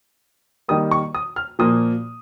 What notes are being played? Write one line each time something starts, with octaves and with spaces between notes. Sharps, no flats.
D#3 G3 A#3 D#6
C#6
D#6
F6
A#2 F3 A#3 D#6